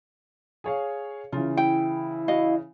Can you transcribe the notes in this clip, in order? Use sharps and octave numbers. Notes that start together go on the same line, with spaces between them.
G#4 C#5 F5
C#3 E3 F4
E4 G5
F#4 D#5 F5